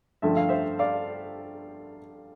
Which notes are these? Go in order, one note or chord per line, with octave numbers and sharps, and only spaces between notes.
G2 D3 F3 A3 E5
F5
C5 E5
D5 F5